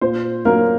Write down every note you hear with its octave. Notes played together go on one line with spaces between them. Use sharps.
A#2 C5
F#3 A#3 A#4